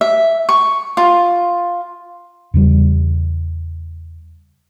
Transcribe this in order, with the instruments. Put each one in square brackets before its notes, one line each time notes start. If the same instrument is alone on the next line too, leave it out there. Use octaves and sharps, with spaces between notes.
[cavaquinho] E5
C#6
F4
[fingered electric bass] E2 C#3 G3